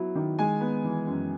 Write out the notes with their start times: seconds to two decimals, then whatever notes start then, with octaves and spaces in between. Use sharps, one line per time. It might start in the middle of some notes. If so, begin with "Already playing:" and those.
Already playing: F#3 B3 E4
0.15 D#3
0.39 G#3 G#5
0.61 B3
0.84 E3
1.07 F#2